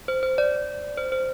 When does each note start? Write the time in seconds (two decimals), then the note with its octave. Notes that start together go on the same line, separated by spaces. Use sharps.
0.08 C5
0.23 C5
0.38 D5
0.97 C5
1.12 C5